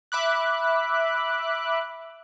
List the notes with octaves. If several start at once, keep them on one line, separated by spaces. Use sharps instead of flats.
E5 B5 D6 F#6